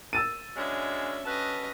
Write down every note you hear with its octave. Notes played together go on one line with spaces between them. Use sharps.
E6 A6 D#7
F#2 G#3 C#4 D4 E5
F#3 C#4 A4 B4 D#5